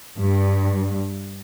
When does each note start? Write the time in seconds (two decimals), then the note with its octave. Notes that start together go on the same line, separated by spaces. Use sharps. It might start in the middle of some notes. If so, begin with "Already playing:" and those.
0.18 G2